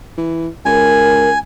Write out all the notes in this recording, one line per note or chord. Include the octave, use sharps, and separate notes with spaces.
E3
C#2 A#4 G#5